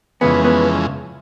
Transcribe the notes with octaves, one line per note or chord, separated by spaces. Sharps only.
F2 C#3 E3 G#3 B3
B3